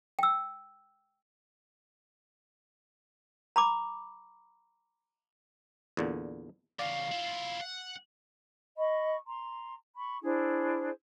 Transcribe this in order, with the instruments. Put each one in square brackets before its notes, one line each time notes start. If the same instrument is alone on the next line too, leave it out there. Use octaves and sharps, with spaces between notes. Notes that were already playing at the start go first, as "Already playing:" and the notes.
[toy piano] G5 E6
A#5 B5 D6
[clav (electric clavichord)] E2 A#2 D3
[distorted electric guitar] E2 C#3 [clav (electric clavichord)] D5 [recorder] F5
[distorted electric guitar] E4 F4
F#5
[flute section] D#5 B5 C#6
A#5 C6
B5 C#6
D4 E4 G#4 C5